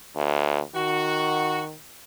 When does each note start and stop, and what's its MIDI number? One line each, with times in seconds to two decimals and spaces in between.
0.15 0.60 38
0.75 1.74 51
0.75 1.62 66